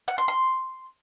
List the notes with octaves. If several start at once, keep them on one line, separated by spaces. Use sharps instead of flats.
F#5
C6
C6